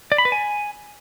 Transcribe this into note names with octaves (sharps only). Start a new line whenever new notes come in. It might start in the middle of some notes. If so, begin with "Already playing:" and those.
D5
B5
B4
G#5